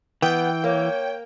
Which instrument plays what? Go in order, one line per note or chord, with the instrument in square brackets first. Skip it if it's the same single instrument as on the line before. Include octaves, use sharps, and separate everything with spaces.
[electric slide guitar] E3 [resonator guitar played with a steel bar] B3 [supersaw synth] G5
[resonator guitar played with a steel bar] A#3 [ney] C#5